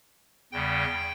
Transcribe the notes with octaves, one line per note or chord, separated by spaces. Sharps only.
E2 C#3 G3 G5